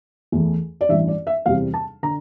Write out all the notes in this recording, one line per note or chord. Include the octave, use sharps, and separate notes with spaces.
E2 E3 A3
D5
A1 G2 E3 E5
D5
E5
E2 C3 G3 C4 F5
A5
D3 A#5